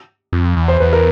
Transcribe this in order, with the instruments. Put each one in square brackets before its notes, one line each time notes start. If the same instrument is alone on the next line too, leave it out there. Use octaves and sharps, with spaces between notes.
[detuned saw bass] F2
E2
[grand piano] C5
[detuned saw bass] E2 [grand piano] B4
[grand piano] A#4